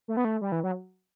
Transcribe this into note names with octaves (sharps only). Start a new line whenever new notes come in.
A3
B3
A3
G3
E3
F#3